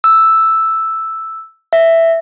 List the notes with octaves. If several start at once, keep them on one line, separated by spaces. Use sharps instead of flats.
E6
E5